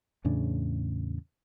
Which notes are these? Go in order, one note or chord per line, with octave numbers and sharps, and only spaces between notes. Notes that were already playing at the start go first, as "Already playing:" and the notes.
E2 A2 C#3 D4